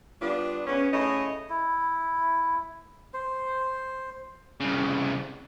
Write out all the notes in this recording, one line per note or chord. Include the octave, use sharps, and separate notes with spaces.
G3 B3 D4 F4
C#3 B3 C#4
C#3 A3 E4 C#5 D#5
E4
C5
C2 C#3